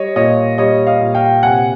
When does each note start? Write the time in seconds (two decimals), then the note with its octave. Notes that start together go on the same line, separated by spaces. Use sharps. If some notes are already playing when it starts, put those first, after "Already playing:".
Already playing: G3 C#5 D#5
0.16 A#2 C#5 D#5
0.58 G3 C#5 D#5
0.87 D#5 F5
1.01 A#2
1.15 F5 G5
1.43 C3 F#5 G#5